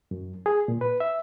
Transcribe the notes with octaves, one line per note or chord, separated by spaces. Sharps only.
F#2
G#4
A#2
B4
E5